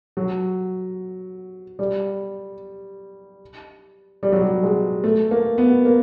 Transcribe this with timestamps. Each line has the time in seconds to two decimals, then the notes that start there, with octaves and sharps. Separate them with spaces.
0.17 F#3
1.79 G3
4.23 G3
4.32 F#3
4.42 G3
4.63 G#3
5.04 A3
5.31 A#3
5.58 B3
5.85 A#3